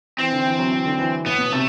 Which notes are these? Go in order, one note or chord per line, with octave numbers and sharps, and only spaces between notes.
E3 C4
D3
E3
F#3
E3
D3
E3
A2 B3
B2
C3 A3